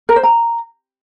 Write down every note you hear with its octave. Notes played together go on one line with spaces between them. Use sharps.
A#4
C5
A#5